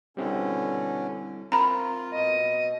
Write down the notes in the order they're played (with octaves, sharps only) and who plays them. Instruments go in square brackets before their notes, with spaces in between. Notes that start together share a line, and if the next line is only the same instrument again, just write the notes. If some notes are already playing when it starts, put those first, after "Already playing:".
[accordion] B2 D3 C#4 [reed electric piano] G3 C4 E4
[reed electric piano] C4 A#4 [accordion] F4 [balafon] A#5 B5
[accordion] B2 [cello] D#5